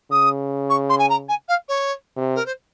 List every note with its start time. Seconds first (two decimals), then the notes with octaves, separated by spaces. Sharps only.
0.11 C#3 D#6
0.70 C#6
0.89 C6
0.99 G#5
1.10 A#5
1.28 G#5
1.48 F5
1.68 C#5
2.17 C3
2.35 A#4
2.46 C5